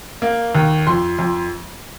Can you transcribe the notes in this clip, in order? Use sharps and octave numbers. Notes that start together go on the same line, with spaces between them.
A#3
D#2
F2 C6
F2